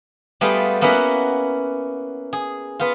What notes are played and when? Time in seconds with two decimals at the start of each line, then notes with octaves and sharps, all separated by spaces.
0.41 G3 A3 B3 F4 G#4
0.81 A#3 B3 C#4 E4 F#4
2.33 G#4
2.80 B3 F4